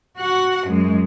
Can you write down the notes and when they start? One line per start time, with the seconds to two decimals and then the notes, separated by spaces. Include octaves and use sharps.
0.18 F#4 F#5
0.68 F#2 G#3